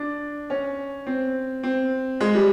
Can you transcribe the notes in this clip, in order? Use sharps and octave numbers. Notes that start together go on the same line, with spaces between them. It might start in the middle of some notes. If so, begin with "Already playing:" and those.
Already playing: D4
C#4
C4
C4
G#3
G3